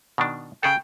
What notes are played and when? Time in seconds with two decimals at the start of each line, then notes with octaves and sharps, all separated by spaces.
0.18 B2 D#3 D4
0.63 C#3 G#4 A4 G5